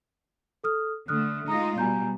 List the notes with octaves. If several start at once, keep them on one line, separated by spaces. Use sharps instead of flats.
A4 D#6 F6
D3 A3 D#6 F6 F#6
G#3 D#4 F4 A#5 D#6 A#6
B2 G3 G#5 A#5 G6